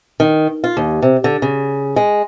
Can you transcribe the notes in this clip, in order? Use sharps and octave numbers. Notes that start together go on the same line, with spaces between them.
D#3
F4
D#2
C3
D3
C#3
G#3